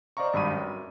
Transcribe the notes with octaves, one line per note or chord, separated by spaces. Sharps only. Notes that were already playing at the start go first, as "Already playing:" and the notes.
C5 D5 D#5 F5 A#5 C#6
G#1 G2 B5 D#7
F#2